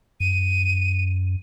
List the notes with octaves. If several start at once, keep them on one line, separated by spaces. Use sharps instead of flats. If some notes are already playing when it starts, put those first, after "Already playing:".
F#2 D#7